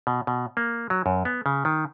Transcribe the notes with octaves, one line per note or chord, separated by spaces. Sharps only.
B2
B2
A#3
F#3
F#2
B3
C#3
D#3